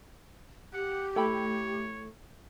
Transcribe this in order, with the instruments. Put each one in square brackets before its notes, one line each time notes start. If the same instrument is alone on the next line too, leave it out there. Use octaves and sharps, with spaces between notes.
[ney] G4 [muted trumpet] F#5
[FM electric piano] A3 [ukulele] E4 G5 B5 [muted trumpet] C#5